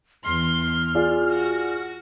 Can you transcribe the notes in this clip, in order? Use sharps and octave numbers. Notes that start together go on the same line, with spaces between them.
E2 C6 F6
F4 G#4 D5
F#4